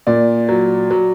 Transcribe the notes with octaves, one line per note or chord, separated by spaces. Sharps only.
A#2 D5
F#3
F#3